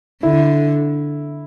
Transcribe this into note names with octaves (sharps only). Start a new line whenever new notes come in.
D3 E4